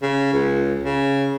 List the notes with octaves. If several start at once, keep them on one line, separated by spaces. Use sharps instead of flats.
C#3
C#2
C#3